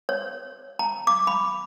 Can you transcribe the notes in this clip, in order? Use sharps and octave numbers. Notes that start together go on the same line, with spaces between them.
C#5
A#5
D6
B5